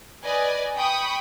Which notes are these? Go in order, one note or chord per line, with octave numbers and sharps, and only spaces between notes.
B4 D5 D#5 G#5
G5 B5 C#6 D#6